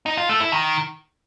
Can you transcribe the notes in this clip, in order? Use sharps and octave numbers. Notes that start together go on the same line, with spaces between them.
D#4
F4
A3
E4
D#3